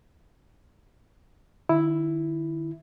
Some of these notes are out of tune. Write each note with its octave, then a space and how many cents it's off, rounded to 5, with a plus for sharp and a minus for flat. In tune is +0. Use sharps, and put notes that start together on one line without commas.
D#3 -35 E4 +0